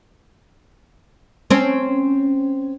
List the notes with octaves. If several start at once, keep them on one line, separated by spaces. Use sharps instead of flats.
C4 C#4